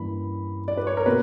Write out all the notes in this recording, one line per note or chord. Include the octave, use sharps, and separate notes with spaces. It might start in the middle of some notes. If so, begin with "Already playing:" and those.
Already playing: G2 E3 A#3 C#4 B5
D5
B4
C#5
A#4
B2 A#3 B4